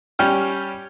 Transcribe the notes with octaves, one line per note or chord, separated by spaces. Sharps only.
G3 C#4 G5 F6